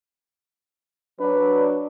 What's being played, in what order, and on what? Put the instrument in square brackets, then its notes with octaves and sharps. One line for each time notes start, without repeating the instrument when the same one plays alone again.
[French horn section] F#3 D4 [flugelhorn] B4